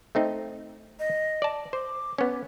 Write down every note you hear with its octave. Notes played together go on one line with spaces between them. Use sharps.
A3 C4 D#4
D#5
D5 A5
C5 D6
B3 C#4